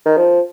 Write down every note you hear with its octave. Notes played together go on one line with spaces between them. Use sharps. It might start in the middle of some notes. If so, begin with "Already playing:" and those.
D#3
F3